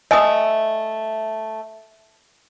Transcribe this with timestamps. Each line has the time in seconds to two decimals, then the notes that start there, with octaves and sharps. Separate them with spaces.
0.11 A3 D#5 E5 G#5 D#6